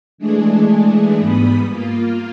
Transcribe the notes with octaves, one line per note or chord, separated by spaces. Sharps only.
E3 G#3 A3 D4 G#4
G#2 G3 B3 B5 D#6
A#3 F4